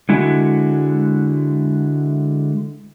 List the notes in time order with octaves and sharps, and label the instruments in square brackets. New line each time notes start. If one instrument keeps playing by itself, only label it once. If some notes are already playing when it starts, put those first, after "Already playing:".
[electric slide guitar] D3 G#3 E4 F#4